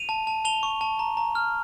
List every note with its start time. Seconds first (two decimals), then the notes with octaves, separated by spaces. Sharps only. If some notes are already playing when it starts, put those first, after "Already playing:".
Already playing: D#7 F7
0.09 A5
0.27 A5
0.45 A5 F7 G7
0.63 C#6
0.81 A5
0.99 A#5
1.17 A#5
1.35 F6